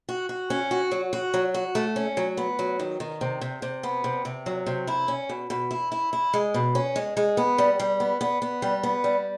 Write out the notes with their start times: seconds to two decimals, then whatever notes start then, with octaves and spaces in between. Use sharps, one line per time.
0.09 F#4
0.29 F#4
0.50 C#4
0.71 F#4
0.91 F#3
1.13 F#4
1.34 F#3
1.54 F#4
1.75 A3
1.96 C#4
2.17 F#3
2.37 B3
2.59 F#3
2.79 D#3
3.00 D#3
3.21 C3
3.41 C3
3.62 C3
3.83 B3
4.04 C3
4.25 C3
4.46 F#3
4.66 C3
4.87 E4
5.08 C#4
5.29 B2
5.50 B2
5.71 E4
5.92 E4
6.13 E4
6.33 G#3
6.54 B2
6.75 C#4
6.96 G#3
7.17 G#3
7.37 B3
7.58 G3
7.80 G3
8.00 B3
8.21 B3
8.42 B3
8.62 G3
8.83 B3
9.04 G3